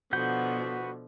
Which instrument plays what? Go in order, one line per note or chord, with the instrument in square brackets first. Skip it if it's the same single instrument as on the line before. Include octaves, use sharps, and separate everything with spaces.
[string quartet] B2 D3 F3 [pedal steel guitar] B3 F#5 G6 [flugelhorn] F#4